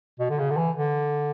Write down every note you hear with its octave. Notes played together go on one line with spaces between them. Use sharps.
B2
D3
C#3
D3
E3
D3